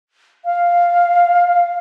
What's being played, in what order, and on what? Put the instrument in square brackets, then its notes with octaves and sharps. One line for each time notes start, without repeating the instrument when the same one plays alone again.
[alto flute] F5